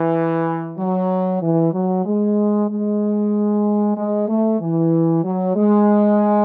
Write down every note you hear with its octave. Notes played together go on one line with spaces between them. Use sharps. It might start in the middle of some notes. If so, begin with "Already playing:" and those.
Already playing: E3
F#3
E3
F#3
G#3
G#3
G#3
A3
E3
F#3
G#3